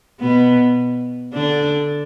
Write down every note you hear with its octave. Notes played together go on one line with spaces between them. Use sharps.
B2 B3
D3 D4